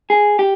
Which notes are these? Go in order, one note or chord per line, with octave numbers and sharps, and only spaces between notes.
G#4
G4